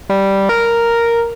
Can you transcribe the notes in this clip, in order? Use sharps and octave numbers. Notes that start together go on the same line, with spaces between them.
G3
A#4